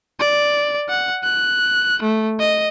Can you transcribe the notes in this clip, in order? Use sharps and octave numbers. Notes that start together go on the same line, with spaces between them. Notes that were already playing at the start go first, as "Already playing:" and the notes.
D5
F#5
F#6
A3
D#5